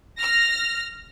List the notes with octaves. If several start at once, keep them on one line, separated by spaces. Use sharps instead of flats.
F6 A#6